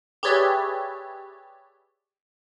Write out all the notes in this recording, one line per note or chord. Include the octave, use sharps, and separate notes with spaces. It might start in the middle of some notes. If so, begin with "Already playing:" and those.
G4 G#4 B4 C#5 D5 E5